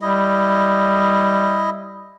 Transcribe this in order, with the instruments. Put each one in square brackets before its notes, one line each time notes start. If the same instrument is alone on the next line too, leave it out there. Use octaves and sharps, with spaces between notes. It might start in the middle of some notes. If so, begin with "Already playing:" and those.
[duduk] G3 [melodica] E4 D#5